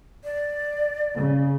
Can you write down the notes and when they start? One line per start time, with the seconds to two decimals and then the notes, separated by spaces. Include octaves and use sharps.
0.24 D5
1.15 C#3